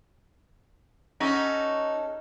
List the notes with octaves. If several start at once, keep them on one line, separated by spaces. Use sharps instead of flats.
C#4 D#4 F#4 A4